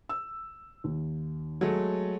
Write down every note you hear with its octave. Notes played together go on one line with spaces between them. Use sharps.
E6
D#2
F#3 G#3 A3